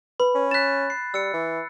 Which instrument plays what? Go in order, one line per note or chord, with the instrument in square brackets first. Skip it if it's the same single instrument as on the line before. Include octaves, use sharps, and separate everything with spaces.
[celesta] B4 [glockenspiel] B5
[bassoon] C#4
[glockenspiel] F#6 A6 [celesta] B6 E7
[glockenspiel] C7
[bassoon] G3 [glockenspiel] E6 C#7
[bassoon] E3